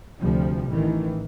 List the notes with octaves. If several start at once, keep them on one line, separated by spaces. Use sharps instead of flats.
D2 C3 F3 G3
A1 D#3 E3